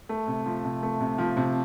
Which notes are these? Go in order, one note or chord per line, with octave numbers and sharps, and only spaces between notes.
A3
C3
F3
C3
A3
C3
F3
C3